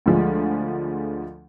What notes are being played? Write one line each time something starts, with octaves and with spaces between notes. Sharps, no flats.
D2 D3 F3 G#3